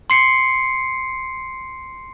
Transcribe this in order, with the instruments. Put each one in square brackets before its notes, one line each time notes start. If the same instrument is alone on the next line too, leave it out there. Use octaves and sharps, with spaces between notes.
[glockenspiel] C6 C7 C#7